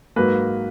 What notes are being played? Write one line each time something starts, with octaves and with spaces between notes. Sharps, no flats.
G#2 F#3 A#3 B4